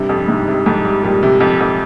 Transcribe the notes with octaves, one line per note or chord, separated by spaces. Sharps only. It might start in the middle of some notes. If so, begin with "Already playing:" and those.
Already playing: G2 C3
F2
G2
G#2 C3
C3
F2 G#2
G3
A#2 G3
C3
F2
F2